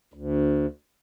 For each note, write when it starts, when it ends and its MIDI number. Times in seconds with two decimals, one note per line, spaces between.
0.14 0.66 38